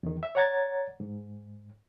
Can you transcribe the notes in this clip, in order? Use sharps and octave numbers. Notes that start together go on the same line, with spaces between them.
E2 D#3
E5
C#5 D5 F#5 A#5 G#6 A6
G#2